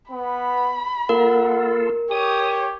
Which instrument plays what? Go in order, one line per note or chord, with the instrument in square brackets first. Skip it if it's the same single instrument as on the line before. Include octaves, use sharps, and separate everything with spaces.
[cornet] B3 [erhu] B5
[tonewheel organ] A#3 F4 A4 [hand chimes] A#4 [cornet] F#5
[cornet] G4 [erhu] C#5 [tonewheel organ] D#6